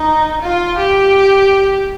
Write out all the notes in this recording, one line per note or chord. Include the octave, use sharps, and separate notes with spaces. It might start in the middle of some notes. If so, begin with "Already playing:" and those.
Already playing: D#4
F4
G4